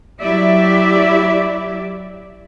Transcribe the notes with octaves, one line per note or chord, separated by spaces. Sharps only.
F#3 E4 G4 D5 E5